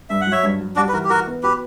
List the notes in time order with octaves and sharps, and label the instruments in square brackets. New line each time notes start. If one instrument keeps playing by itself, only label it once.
[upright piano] G2 [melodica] E5
[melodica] F#5
[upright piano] F#3 [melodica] C#5 E5
[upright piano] G2
F#3
[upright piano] G3 [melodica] D4 F#4
[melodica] B4
[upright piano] E3 [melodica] F#4 A#4
[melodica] G4
[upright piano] E3 [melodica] F#4 A#4
[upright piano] B3
[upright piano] F#4 [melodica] G4 B4